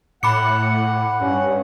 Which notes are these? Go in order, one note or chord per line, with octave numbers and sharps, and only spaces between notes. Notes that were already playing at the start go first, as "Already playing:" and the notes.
A2 F#5 B5 D6 C#7
G2 C#4